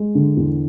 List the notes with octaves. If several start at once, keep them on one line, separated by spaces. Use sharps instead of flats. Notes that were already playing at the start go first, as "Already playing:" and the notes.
Already playing: G#3
D3
E2